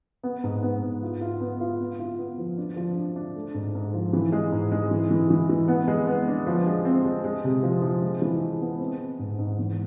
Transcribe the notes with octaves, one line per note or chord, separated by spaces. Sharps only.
B3
G#2
B3
G#2
F4
F4
B3
F4
B3
F4
B3
F3
D4
F3
D4
D4
A3
G#2
G#2
F3
E3
G#3
G#2
G#3
E3
E3
E3
E3
B3
G#3
B3
D4
F3
G#3
C4
G#3
G#3
C3
F3
F3
G#3
E3
G#3
B3
C4
C4
G#2
G#2
E2